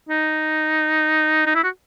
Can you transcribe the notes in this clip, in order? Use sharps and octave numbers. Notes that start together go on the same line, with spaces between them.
D#4
D#4
E4
F#4